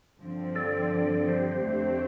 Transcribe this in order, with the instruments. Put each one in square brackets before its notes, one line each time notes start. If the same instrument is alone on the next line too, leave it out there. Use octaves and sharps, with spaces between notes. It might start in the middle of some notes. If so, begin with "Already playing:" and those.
[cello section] G2 D3 F3 C4
[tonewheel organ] A4 D5
G4 C5
[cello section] F2 D3 A3 C4